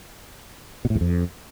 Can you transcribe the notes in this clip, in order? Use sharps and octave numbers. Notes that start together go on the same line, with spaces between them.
B2
A2
E2
F2